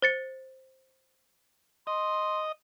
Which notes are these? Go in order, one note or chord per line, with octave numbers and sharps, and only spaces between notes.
C5 A6 C#7
D#5 C6